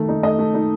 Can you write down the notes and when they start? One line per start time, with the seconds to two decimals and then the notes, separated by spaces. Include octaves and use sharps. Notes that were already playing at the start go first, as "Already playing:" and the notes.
Already playing: D#3 A3
0.09 D#4
0.23 A3 D#5
0.39 A3
0.54 D#4